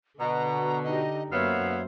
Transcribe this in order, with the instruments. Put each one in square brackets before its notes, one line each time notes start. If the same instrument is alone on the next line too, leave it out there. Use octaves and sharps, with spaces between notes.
[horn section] B2 [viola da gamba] D3 [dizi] A#5
[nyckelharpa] D#4 G4 [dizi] D#5
[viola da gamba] F#2 C5 [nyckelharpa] A#3 E5 [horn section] B3 F5 [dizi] C#5